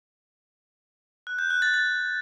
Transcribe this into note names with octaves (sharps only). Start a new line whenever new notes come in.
F#6
G6
F#6
A6
A6